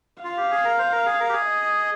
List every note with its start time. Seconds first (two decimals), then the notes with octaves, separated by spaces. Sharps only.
0.24 F4 F5
0.37 G4
0.51 G#4
0.65 A#4
0.79 C5
0.92 A#4
1.06 G#4
1.20 A#4
1.29 G4
1.33 G#4
1.46 D#5